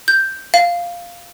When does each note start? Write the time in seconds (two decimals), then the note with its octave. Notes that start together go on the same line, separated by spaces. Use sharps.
0.08 G6
0.54 F5